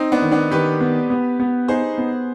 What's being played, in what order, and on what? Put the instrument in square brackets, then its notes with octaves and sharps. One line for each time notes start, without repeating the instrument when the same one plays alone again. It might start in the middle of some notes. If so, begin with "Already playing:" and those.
Already playing: [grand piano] C4 D#4
B3 D4
[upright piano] D#3
[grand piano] B3 D4
[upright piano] D#3 [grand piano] G4 B4
[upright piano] B3
B3
B3
[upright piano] D#4 [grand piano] G#4 C5
[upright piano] B3